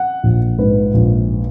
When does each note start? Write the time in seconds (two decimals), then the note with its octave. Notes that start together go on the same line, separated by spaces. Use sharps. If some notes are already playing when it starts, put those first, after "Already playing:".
Already playing: F#5
0.23 A#1
0.58 G#2 B4
0.94 A#1